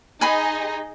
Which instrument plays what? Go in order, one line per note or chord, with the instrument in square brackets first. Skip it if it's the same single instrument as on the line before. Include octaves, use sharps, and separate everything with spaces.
[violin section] D#4 G#4 D#5 [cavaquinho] G#5 B5 C6